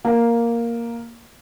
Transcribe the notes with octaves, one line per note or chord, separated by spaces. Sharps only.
A#3